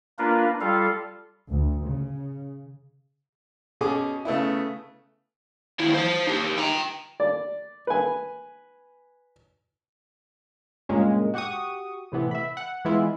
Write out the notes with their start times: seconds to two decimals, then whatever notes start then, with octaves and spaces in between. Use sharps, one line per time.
0.19 A#3 D4 F4 A#4 B4
0.61 G3 F4 A4 F5
1.49 D2
1.87 C#3
3.81 B2 C#4 G#4 D6
4.25 C#3 A3 B3 E4
5.79 D#2 E4
5.94 C5 A5
6.27 D#4 G4
6.58 G5 A#5
7.20 D5
7.87 B4 G#5
10.89 G2 A#2 C#3 G#3 A#3 C#4
11.34 F#4 G4 F#5 C#6 D#6
12.12 A2 C3 E3 B3
12.31 E5 B5
12.57 F#5
12.85 E3 G#3 B3 E4 F4